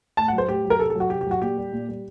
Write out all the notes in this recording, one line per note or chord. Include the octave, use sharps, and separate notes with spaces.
A2 A5
F#5
F#3
C5
A2 G4
F#3
A#4
C3 A4
A4
F#3 F#4
C3 G4
G4
F#3 F#4
A#2 G4
G3
A#2
G3